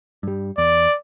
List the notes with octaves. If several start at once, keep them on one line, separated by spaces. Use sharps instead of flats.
G2 G3
E2 D5